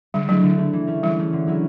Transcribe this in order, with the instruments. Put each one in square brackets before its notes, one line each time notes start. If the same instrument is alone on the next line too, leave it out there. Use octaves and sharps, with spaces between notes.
[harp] D3 [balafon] G3
[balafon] F#3 [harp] A3
[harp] E4
D3
A3 E4
E3
A3 C#4
[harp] E3 [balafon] G3
[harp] A3 C#4
D3
F#3 A3 C#4 E4